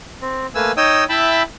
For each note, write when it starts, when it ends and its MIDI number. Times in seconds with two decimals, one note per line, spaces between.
0.21 0.47 60
0.55 0.72 57
0.55 0.72 58
0.55 0.72 71
0.55 0.72 80
0.55 0.72 88
0.77 1.04 63
0.77 1.04 73
0.77 1.04 75
0.77 1.04 79
0.77 1.04 87
0.77 1.04 88
1.09 1.43 64
1.09 1.43 76
1.09 1.43 79
1.09 1.43 81
1.09 1.43 83